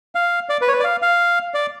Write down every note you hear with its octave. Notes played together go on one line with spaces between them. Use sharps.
F5
D5
B4
C#5
B4
D5
F5
F5
D5